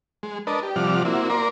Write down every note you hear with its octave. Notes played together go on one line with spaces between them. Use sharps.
G#3
D4 A#4 B4 D#5 A5
G4
C3 F3 G3 D5 F#5 F6
A#3 C4 E4 F#4
A#3 A#4 D5 A#5 C6